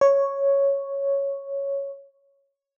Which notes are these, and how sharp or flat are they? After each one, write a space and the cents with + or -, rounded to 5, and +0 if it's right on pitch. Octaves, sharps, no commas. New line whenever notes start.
C#5 +0